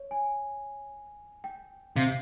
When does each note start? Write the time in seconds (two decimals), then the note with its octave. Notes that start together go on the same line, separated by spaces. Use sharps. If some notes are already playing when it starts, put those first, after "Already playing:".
Already playing: C#5
0.11 G#5
1.44 G5
1.96 C3 F5